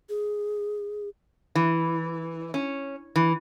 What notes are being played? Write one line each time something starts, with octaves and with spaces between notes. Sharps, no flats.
G#4
E3
C#4
E3